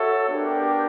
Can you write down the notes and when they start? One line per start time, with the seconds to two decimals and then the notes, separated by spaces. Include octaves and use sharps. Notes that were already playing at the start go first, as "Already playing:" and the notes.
Already playing: F#4 A4 C#5 E5
0.29 B3 D4 G4 A#4